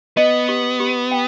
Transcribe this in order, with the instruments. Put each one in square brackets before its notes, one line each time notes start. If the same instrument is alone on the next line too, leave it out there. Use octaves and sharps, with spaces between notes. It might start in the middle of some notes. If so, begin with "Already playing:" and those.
[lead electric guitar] B3 [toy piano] D#5
[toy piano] G4
G4
G5